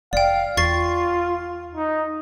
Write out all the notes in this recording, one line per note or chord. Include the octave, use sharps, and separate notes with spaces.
F1 D5 F5 G5
E2 F4 C#6 A6 C7
D#4